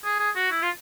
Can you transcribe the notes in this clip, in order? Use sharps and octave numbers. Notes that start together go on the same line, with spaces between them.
G#4
G#4
F#4
E4
F4